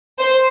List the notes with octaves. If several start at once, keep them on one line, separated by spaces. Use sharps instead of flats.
C5